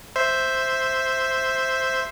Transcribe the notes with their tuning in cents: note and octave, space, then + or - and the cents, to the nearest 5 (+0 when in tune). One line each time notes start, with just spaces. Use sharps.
C5 +0 E5 +0